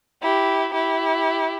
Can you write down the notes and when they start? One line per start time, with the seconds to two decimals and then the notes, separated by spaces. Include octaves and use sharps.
0.22 E4 G4
0.74 E4 G4